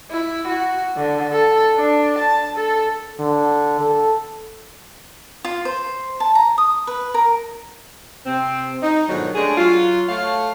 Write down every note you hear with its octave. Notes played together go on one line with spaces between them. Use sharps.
E4
F#4
D3
A4
D4
A5
A4
D3
A4
F4
C5
A5
A#5
D#6
B4
A#4
C3 C4
D#4
G#2 B2 D3 D#3 F3 F#3
G#3 A3 C#4 D4 G4 G#4
F#3 F4
A3 C#5 F5